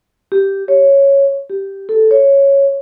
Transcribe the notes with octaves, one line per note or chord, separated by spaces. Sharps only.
G4
C#5
G4
A4
C#5